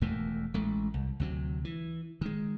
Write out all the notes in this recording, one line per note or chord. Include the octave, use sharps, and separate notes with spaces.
E1 D#2 A#2 A3
A1 G#3 A3
C2
D2 C3 F#3
E3
D#3 G#3